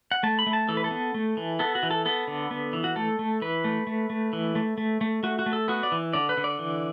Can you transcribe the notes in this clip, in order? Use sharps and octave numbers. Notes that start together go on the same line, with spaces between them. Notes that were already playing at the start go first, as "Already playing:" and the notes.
F#5
A3 A5
B5
A3
A5
E3 A4
B4
A4
B3
A3
E3
B3 A4
F#4
E3
A4
B3 A4
D3
B3
E3
F#4
A3 A4
A3
E3 B4
A3
A3
A3
E3
A3
A3
A3
A3 F#4
F#4
A3
A4
B3 F#4
D5
E3
D3 D5
B4
D3
D5
E3